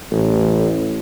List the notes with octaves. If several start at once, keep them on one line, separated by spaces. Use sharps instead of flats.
A1